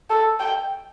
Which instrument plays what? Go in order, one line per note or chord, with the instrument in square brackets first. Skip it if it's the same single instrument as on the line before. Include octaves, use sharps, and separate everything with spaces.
[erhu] A4
G5